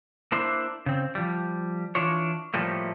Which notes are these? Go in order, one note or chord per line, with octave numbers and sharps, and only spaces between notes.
A#3 D4 E4 C5
C#3 C4
F3 G3
E3 D4 F4 C#5
A2 F3 G3 A3 A#3